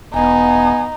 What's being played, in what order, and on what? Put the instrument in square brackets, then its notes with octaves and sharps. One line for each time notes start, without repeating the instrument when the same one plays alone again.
[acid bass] E1 [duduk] B3 [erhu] D#4 [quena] G#5